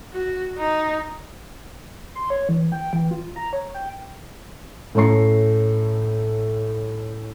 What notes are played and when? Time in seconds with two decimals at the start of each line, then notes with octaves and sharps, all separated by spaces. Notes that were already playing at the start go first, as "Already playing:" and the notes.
0.13 F#4
0.58 D#4
2.15 C6
2.30 C#5
2.49 E3
2.72 G5
2.93 E3
3.11 F4
3.36 A#5
3.53 C#5
3.74 G5
4.95 A2 A3 C#4 A#5 C#6 C7